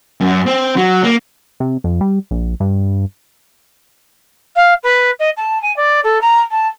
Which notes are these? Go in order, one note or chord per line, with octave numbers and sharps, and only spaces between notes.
F#2
C4
F#3
A#3
C3
F2
G3
A#1
G2
F5
B4
D#5
A5
G#5
D5
A4
A#5
A5